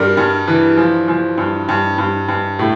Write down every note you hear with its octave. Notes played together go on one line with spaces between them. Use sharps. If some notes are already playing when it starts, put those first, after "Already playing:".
Already playing: G2 G3 A#4 D5
G2
E3
F3
F3
G2
G2
G2
G2
A2